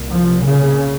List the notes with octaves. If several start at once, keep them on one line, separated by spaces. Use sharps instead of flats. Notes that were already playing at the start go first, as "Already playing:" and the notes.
Already playing: C2 A#2
F3
C#3